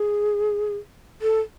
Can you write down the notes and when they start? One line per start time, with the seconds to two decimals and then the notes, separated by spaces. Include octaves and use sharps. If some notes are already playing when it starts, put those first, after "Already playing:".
Already playing: G#4
1.22 A4